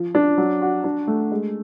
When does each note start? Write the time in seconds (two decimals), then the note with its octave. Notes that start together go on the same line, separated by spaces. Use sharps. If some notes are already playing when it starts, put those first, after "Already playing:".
Already playing: F3
0.15 D4
0.38 F#3
0.62 F#4
0.84 D4
1.07 A3
1.32 G#3